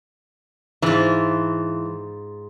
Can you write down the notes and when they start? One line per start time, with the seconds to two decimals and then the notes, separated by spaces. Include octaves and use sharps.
0.82 G#2 E3 F4